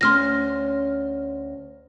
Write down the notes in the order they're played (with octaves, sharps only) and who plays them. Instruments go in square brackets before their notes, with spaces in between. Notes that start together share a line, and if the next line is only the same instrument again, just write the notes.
[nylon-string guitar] D2 C#4 [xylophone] C6 F6 A#6